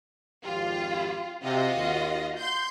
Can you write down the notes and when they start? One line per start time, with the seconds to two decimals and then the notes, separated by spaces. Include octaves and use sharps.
0.45 G#1 F2 F4 G4
1.43 C3 F4 F#4 D#5
1.76 D#2
2.40 C6 G6